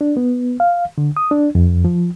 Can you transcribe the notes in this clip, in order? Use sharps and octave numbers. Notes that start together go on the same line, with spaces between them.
D4
B3
F5
D3
D#6
D4
F2
F3